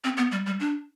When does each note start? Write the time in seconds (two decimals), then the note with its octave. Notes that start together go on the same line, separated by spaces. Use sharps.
0.04 C4
0.17 B3
0.32 G3
0.46 G3
0.60 D4